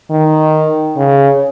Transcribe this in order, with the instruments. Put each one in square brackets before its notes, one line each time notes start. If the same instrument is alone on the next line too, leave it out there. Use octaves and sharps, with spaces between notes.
[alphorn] D#3
C#3